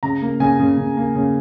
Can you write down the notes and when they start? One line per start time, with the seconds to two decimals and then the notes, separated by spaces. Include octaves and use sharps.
0.03 C#3 A#5
0.22 A#3
0.40 C#3 G#5
0.59 C#3
0.78 C#3
0.97 A#3
1.15 C#3